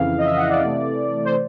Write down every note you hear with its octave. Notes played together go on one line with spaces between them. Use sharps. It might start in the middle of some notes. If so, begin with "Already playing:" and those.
Already playing: F2 C#3 E3 F5
D#5
E5
F#5
D5
C3 E3 A3
C5